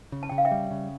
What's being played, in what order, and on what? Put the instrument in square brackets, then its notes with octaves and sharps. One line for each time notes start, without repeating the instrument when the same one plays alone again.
[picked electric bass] C#3
[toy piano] A5
[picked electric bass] C#3 [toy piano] G5
[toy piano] F5
E5 G5
[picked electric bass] G3
C#3